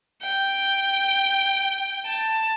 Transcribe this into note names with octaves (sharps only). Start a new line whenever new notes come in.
G5
A5